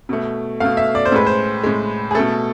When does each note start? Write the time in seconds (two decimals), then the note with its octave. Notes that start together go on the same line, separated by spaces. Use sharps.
0.09 B2 A3
0.60 B2 A3 F5
0.77 E5
0.95 D5
1.05 C5
1.12 A2 G#3 B4
1.27 C5
1.63 A2 G#3
2.11 G#4
2.15 B2 A3 A4